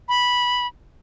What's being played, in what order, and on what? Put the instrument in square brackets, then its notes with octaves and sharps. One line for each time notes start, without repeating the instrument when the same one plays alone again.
[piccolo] B5